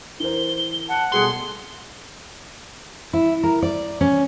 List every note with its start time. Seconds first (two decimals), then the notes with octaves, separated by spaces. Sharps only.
0.20 E3 A#4 C5 G7
0.89 F#5 A5
1.12 B2 G3 A3 G#4 C6
3.13 E4
3.43 A#4
3.62 D5
4.01 C#4